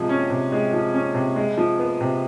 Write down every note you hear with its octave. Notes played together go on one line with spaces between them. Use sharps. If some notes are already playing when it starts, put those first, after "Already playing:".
Already playing: C3 F3 G#3
C#4
C3
G#3
F3
C#4
C3
G#3
F3
B3
C3